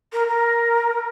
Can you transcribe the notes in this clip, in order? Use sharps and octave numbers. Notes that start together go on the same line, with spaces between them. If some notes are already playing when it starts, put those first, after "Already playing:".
A#4
A#4